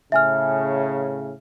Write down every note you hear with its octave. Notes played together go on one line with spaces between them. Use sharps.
A2 C#3 E5 G#5 F6